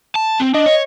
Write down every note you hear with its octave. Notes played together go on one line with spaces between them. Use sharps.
A5
C4
D4 D#5
C#5